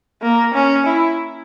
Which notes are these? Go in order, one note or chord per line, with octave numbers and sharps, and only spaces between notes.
A#3
C#4
E4